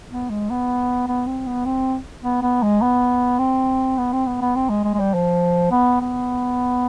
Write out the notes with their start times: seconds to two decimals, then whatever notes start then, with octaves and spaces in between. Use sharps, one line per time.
0.10 B3
0.30 G#3
0.50 B3
1.08 B3
1.26 C4
1.46 B3
1.65 C4
2.23 B3
2.42 B3
2.63 G#3
2.82 B3
3.39 C4
3.98 B3
4.13 C4
4.26 B3
4.42 B3
4.55 C4
4.69 G#3
4.84 G#3
4.94 G#3
5.00 G3
5.14 F3
5.71 B3
6.01 B3